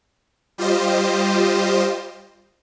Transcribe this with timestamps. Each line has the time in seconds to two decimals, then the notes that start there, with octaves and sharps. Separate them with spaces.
0.58 G3 F4 G4 C5 D#5